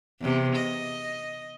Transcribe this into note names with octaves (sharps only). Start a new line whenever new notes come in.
E2 C3
D#5